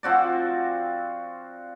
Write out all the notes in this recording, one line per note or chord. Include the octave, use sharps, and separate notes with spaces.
F3 C4 F#4 D5